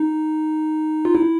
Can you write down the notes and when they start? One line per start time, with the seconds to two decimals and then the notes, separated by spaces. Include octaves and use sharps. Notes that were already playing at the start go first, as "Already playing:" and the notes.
Already playing: D#4
1.05 F4
1.15 E4